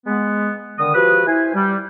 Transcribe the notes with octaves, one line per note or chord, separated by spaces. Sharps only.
G#3 B3
D3 D#3 D#6
F3 F#4 G4 B4
E4 C5 G#5
G3